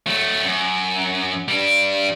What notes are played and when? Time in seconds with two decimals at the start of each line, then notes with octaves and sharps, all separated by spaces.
0.07 F#3 A3
0.44 F#2
1.48 G3 D4